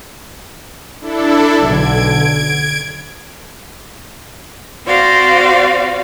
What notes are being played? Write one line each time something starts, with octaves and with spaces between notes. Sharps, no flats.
D4 E4 A4
B1 D3 G#6 D7
C4 F#4 C5 D5 F5